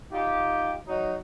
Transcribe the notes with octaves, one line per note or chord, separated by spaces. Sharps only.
D#4 F4 G4
F#3 D#4